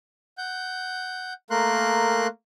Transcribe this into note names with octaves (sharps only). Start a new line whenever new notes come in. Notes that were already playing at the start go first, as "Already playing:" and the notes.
F#5 G6
A3 A#3 A#4 C6 F#6